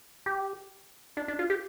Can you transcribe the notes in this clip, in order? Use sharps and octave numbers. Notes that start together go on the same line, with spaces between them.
G4
D4
D4
F4
G4